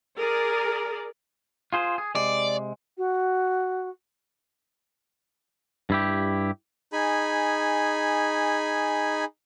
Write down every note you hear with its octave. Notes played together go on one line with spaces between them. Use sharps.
G#4 A#4 D5
F4 G#4 C5
G#4
C3 G#3 D5
F#4
G2 E4 G4
D#4 G#4 G#5 B5